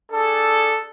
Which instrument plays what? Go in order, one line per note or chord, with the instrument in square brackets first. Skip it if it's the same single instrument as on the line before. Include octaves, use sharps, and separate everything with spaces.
[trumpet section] D4 G#4 A4